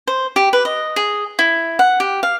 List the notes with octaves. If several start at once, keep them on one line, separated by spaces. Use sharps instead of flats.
C5
G4
B4
D#5
G#4
E4
F#5
G4
F5